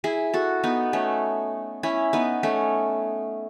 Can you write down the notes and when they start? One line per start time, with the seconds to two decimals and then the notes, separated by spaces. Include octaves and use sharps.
0.04 E4 G#4
0.33 F#4 A4
0.64 B3 D#4
0.93 A3 C#4
1.83 C#4 E4
2.13 B3 D#4
2.43 A3 C#4